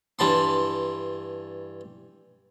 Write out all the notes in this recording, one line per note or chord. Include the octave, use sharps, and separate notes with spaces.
G2 E3 A5 B5 C6